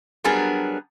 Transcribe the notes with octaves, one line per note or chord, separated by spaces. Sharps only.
F#3 G3 B3 D4 G#4 A#4